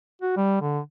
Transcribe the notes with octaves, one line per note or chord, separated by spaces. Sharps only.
F#4
G3
D3